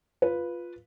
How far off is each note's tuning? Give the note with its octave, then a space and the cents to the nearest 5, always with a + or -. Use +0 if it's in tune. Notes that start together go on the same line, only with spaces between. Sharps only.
F4 +0 B4 -5